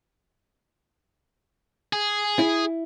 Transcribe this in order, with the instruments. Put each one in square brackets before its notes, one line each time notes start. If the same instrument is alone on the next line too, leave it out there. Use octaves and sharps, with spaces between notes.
[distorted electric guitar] G#4
[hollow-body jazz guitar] E4